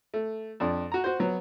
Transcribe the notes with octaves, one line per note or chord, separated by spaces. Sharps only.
A3
F2 D4
F#4 A#5
F#4 C5
F#3 B3